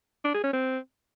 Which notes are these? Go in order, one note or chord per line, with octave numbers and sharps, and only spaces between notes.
D4
G#4
C#4
C4